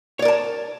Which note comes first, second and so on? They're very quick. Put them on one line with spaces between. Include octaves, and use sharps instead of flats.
C#5 D5 A#4 A5